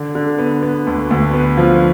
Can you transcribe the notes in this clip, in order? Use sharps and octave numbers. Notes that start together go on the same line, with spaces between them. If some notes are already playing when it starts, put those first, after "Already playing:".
Already playing: D3
D3
B3
B3
D2
D2
B3
F3